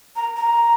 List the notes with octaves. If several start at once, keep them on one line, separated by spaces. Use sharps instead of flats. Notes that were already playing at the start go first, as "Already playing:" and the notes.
A#5
A#5